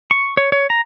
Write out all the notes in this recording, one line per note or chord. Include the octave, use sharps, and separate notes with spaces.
C#6
C#5
C#5
A#5